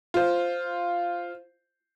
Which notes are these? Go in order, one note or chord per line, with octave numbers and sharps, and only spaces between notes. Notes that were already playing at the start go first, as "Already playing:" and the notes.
F4 C5